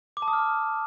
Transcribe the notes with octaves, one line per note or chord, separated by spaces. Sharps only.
D6
A5
D#6
F6